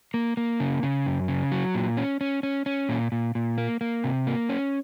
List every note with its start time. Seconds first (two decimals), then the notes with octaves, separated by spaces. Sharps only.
0.14 A#3
0.37 A#3
0.60 C#3
0.83 C#3
1.06 F#2
1.28 C#3
1.52 F#3
1.74 A#2
1.97 C#4
2.21 C#4
2.43 C#4
2.66 C#4
2.89 A#2
3.12 A#2
3.35 A#2
3.58 A#3
3.81 A#3
4.04 C3
4.27 A#3
4.49 C#4